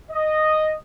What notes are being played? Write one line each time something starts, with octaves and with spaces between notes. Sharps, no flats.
D#5